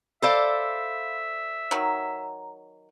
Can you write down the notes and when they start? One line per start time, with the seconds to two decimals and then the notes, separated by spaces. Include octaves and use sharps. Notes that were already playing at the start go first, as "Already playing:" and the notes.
0.22 A4 C5 D5 E5 F5 B5 E6
1.71 D#3 F#3 A#5